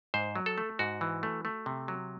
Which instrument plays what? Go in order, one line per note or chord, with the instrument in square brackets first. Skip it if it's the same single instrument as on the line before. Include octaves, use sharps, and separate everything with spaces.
[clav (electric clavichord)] G#2 C5
F#3
A4
A3
G#2 F#4
E3
A3
A3
C3
F#3